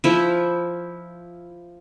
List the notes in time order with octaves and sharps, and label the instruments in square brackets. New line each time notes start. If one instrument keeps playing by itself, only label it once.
[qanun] F3 E4